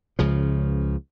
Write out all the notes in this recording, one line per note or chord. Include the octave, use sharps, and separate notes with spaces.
C#2 C#3 F3